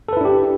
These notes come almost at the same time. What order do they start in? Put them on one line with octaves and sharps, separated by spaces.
A4 B4 E4 D4 G4